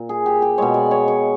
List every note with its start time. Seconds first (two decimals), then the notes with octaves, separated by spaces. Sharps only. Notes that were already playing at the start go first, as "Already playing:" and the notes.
Already playing: A#2
0.09 G#4
0.26 G4
0.42 G4
0.58 B2 G#3 C#5
0.74 D5
0.91 C#5
1.08 C#5